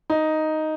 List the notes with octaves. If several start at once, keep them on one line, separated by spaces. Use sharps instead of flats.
D#4